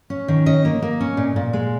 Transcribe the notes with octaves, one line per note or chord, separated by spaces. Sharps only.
C#4
D#3
C#4 D#5
A#3
A#3
C#4
A#2
A#2
G#3